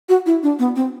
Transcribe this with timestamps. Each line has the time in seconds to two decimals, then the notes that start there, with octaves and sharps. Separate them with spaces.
0.09 F#4
0.26 E4
0.43 D4
0.59 B3
0.76 C4